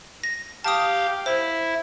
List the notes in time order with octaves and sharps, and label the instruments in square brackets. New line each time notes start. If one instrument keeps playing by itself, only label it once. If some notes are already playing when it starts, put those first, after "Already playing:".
[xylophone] A#6
[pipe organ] G4 F5 [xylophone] A5 D#6
[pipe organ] E4 [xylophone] C5